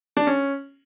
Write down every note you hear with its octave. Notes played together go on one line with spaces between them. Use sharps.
D4
C#4